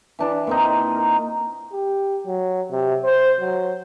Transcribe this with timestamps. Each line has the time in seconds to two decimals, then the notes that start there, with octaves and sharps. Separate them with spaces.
0.19 E3 D4 B4
0.47 A#2 C4 D#4
0.96 A#4
1.72 G4
2.27 F#3
2.71 C3
3.04 C5
3.40 F#3